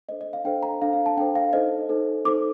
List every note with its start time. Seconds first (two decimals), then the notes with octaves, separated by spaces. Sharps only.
0.09 D4 A4 C5 D#5
0.21 D#5
0.33 F5
0.45 D4 A4 C5 G5
0.63 A#5
0.82 D4 A4 C5 F5
0.93 F5
1.06 A5
1.17 D4 A4 C5 G5
1.35 F5
1.53 D#4 A4 C5 D#5
1.89 D#4 A4 C5
2.25 D#4 A4 C5 D6